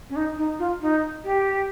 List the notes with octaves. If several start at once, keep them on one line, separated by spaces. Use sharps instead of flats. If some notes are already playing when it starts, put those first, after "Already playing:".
C#4
D#4
D#4
F4
D#4
G4